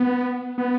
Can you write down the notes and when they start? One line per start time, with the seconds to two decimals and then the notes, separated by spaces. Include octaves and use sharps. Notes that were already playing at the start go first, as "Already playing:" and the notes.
Already playing: B3
0.58 B3